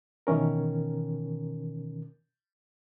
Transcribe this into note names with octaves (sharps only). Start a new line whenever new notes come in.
B2 D#3 E3 C#4 A#4